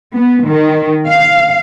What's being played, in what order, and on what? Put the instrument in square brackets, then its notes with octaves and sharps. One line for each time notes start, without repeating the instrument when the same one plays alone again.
[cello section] B3
D#3
F5